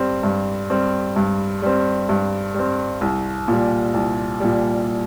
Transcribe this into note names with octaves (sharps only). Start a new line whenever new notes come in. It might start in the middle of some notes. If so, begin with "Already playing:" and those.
Already playing: G2 G3 C4
G2
G3 C4
G2
G3 C4
G2
G3 C4
C2
A#2 G3
C2
A#2 G3